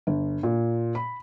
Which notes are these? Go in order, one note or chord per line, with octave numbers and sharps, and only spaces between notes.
G1
A#2
B5